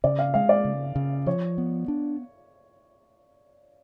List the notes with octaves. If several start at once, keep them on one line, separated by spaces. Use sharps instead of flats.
C#3 D5
F5
G#3 F5
D5
C#3
C#3
F3 C#5
B3
D4